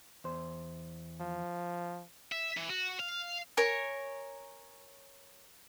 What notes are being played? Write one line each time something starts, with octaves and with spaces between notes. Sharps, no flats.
E2 C5
F3
E5
E3
F#4
F5
A#4 C#5 G#5 C#6